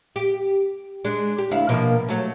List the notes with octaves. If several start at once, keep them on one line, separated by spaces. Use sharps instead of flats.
G4
G#3 D4
G4
D2 E4 F5
B2 F3 A#3
F#3 A3